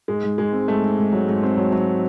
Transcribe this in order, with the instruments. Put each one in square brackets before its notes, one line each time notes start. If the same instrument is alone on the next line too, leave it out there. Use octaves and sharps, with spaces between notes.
[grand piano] G#2 [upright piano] G#3
[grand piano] G#2
[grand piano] G#2 [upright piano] G#3
[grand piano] C4
[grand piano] G#2 [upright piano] A3
[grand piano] G#2
G#2
F#3
G#2
C4
F#3
F#3